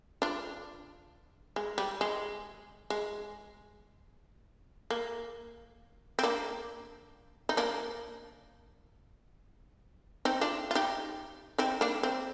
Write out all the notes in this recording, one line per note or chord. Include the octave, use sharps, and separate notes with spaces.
D4 F4
G#3
G3
G#3
G#3
A#3
C4
A#3 D4
D#4
A#3 D4
C4 D#4
D4 F4
F4
D#4 G4
C4 D#4
A#3 D4
C4